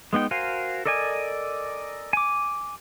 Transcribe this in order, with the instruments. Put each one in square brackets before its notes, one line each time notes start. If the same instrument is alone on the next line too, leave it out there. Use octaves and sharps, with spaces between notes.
[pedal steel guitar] G#3 B3 D#4 G5
F#4 A#4 C5 F5 G#5
A4 A#4 D5 D#5 G#5
G#5 D6